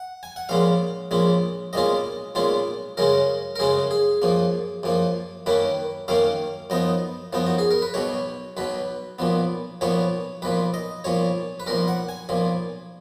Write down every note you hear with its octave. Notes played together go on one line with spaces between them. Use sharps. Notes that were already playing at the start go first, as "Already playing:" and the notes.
Already playing: F#5
G#5
F#5
A#1 A#2 G#3 C#4 F5
A#1 A#2 G#3 C#4
B1 A#2 G#3 C#4 F4 D#5
B1 A#2 G#3 C#4 F4
F#2 C#3 G#3 C#4 A#4
A#4
F#2 C#3 G#3 C#4 G#4
G#4
F#2 F3 A#3
F#2 F3 A#3
F#2 D#3 A#3 C#4 B4
F#2 D#3 A#3 C#4 F5
F#2 F3 B3 D#4 D#5
F#2 F3 B3 D#4
F#4
G#4
A#4
B4
B1 B2 F#3 C#5
B1 B2 F#3 B4
B1 A#2 F3 B3
B1 A#2 F3 B3 C#5
B1 A#2 F3 B4
D#5
B1 A#2 F3 C#5
B4
B1 A#2 F3 A#4
F#5
G#5
B1 A#2 F3